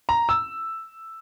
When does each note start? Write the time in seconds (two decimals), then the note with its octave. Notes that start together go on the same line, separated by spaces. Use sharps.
0.09 A#5
0.29 E6